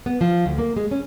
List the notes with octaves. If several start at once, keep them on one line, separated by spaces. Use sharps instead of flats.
B3
F3
D2
A#3
G#3
C#4